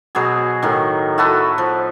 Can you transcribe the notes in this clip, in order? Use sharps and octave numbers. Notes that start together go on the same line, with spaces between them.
B2 F#3 B3 G#4
A2 D#3
E4 F#4 A4 B4
F3